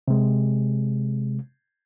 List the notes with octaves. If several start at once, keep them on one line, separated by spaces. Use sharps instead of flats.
C3 G#3